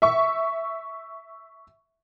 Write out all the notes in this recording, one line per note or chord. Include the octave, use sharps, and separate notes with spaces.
E5 C#6